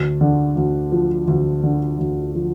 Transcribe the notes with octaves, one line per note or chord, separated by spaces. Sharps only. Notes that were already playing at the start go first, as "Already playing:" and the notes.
Already playing: D2
D3
D2
F3
D2
D3
D2
F3